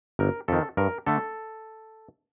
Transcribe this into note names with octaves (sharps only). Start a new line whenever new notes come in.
G1 A#4
F2 D#3 A4
G2 A#4
D3 A3 A4